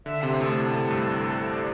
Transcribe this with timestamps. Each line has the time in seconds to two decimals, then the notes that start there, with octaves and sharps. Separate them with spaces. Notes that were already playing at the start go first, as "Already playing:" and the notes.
0.06 D3 E5
0.22 C3 C6
0.33 C5
0.40 A2 A4
0.57 C3 A4
0.73 C3
0.84 A2
0.90 G2
1.49 D5